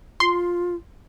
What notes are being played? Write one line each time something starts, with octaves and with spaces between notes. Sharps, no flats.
F4 C6